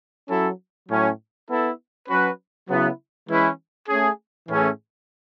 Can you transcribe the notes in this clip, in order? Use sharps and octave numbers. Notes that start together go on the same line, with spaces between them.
F#3 C#4 E4 A4
A2 F#3 C#4
B3 E4 A4
F#3 C#4 F#4 B4
C#3 F#3 B3 E4
E3 G#3 C#4 E4 B4
A3 C#4 G#4
A2 E3 A3 C#4 G#4